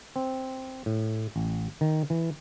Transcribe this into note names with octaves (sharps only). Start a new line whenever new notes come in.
C4
A2
A1
D#3
E3